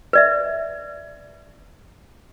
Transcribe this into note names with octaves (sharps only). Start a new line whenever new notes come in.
B4 D5 E5